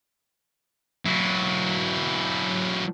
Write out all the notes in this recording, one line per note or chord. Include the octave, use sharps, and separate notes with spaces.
F#3 E4